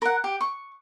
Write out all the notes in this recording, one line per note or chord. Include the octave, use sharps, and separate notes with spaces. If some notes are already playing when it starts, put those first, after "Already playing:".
A#4 F#5
G4
C#6